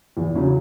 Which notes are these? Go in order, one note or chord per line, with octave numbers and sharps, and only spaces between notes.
E2
C#3 F#3 C#4 E4